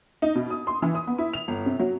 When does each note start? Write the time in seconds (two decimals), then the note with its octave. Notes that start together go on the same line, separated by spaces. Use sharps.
0.22 D#4
0.35 B2
0.50 D#6
0.67 C6
0.82 E3
0.95 D#6
1.07 B3
1.18 E4
1.33 F7
1.48 G1
1.66 C3
1.80 F#3